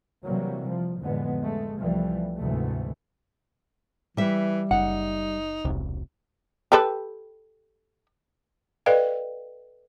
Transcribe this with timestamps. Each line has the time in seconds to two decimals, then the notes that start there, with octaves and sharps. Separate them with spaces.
0.24 C3 E3 F#3 G3 A#3
0.68 F3
1.00 F2 A2 D3 E3 G#3 B3
1.42 G#3 A3
1.79 C2 E3 F3 G3 A3
2.37 D2 G#2 C3 E3 A3
4.17 E3 G3 E5
4.71 F#1 D#4 F#5
5.65 E1 C2
6.72 G4 A4 B4
8.86 A4 B4 D5 D#5 F5 G5